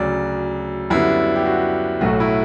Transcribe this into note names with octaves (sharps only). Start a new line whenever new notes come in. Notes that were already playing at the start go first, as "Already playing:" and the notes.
Already playing: D2 C#3 F#3 D5
F#2 D3 G3 B3 E4
G4
F#4
B1 A2 F#3 A3 F#4
E4